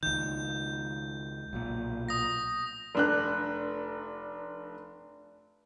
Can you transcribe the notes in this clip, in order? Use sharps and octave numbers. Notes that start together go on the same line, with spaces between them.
C#2 D#3 G6
B1 A#2
D#6 A#6
F1 D4 F#6